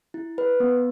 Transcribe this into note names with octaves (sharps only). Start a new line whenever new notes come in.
E4
B4
B3